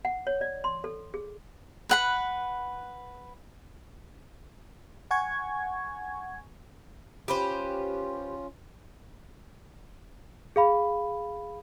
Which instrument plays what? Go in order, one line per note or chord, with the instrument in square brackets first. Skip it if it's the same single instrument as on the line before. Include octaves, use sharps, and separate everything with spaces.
[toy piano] F#5
C#5
D5
C6
A4
G#4
[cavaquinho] B4 F#5 B5
[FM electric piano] F#5 G#5 C#6 G#6
[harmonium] C#4 F4 [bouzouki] G4 B4 C5
[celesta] G#4 F5 B5